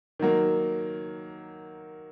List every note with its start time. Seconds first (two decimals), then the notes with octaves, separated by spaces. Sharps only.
0.19 D#3 F#3 A#3